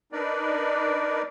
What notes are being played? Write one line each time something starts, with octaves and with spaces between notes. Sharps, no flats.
D4 D#4 A#4 B4 D5